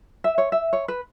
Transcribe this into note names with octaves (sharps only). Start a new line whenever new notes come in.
E5
C#5
E5
C#5
B4